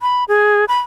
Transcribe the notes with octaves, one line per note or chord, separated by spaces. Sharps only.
B5
G#4
B5